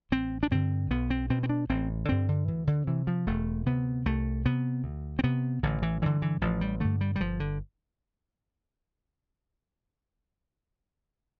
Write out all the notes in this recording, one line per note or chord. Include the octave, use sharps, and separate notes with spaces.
A1 C4
D4
G2 D3 C4
B1 B3
C4
B2 C4
C4
D4
A1 C4
G2 D3 C4
D3
D2 E3
D3
C3 E3
F3
E1 A3
D2 C3 B3
C2 A3
C3 B3
D2
C4
C3 B3
A1 D3
E3
G2 D3 E3
E3
A1 F3
G3
G2 D3 A3
G3
G3
G1 F3
D3